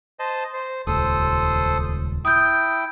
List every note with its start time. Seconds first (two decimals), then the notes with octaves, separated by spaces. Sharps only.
0.19 C5 D#5 A5
0.53 C5
0.87 D#1 C#2 A4 C5 D#6
2.25 E4 G5 D#6 G6